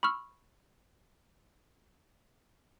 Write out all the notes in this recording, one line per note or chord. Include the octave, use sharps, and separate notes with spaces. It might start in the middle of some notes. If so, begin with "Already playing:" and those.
B5 C#6 E6 F6